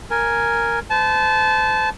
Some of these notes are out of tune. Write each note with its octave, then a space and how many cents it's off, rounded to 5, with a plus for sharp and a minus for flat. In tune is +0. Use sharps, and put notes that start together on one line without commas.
A#4 +0 G#5 +0
C5 -40 A5 -20